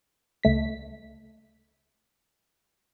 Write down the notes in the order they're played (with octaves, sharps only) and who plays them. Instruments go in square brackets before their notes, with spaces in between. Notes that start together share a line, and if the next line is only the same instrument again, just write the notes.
[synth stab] C#2 A3 B6